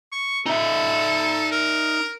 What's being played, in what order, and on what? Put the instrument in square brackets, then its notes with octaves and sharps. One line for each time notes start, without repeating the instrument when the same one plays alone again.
[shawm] C#6
[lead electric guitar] D#4 E5 [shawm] A4
[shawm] A#4